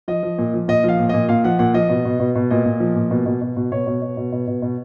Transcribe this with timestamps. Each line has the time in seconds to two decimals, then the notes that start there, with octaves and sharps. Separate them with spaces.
0.08 F3 D#5
0.23 F3
0.38 A#2
0.54 F3
0.68 A#2 D#5
0.84 F3 F5
0.99 A#2
1.09 A#2 D#5
1.29 A#2 F5
1.44 F3 F#5
1.59 A#2 F#5
1.74 F3 D#5
1.90 B2
2.05 B2
2.20 B2
2.36 B2
2.50 A#2 D#5
2.65 A#2
2.80 F3
2.96 A#2
3.11 B2
3.26 B2
3.41 B2
3.57 B2
3.72 B2 C#5
3.87 B2
4.02 B2
4.17 B2
4.33 B2
4.48 B2
4.62 B2